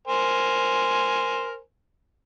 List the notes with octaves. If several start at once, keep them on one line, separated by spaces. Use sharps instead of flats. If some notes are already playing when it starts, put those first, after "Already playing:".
A#4 C5 G#5